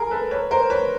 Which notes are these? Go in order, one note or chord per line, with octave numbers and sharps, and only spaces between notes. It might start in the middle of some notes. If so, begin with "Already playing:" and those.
Already playing: G#4 A#4
A4 B4
B4 C#5
A#4 C5
B4 C#5